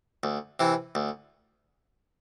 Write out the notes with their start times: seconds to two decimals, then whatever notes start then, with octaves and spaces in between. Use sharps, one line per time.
0.23 D2
0.60 C3 E3
0.95 D2